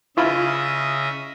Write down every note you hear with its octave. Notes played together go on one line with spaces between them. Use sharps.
C#3 E4 F4 D#5 E5 B5